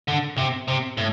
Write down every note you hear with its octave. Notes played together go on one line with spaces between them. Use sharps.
D3
C3
C3
A2